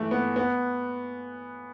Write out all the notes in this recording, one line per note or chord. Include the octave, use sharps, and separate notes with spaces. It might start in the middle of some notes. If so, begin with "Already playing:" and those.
Already playing: E3 A3
B3
B3